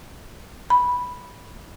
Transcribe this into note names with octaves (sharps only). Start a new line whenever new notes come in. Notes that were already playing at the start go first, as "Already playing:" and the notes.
B5